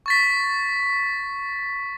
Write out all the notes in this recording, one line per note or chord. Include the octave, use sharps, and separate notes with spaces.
C#6 A6 B6